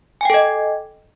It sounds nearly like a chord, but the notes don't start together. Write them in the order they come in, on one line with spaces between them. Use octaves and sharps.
G#5 G5 A4 D#5